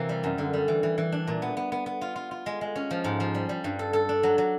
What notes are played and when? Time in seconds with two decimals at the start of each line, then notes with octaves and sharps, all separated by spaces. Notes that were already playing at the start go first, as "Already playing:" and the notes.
Already playing: C3 E3 A#3 G4
0.09 G3
0.24 F#2
0.38 D3
0.53 G3
0.68 E3
0.83 E3
0.98 E3
1.12 D4
1.27 A#2
1.42 B3
1.57 B3
1.72 B3
1.86 B3
2.01 F4
2.16 F4
2.31 F4
2.46 G#3
2.61 G#3
2.75 C#4
2.91 F3
3.04 G#2
3.20 F3
3.35 G3
3.49 G3
3.64 G2
3.79 A4
3.93 A4
4.09 D4
4.23 F#3
4.38 F#3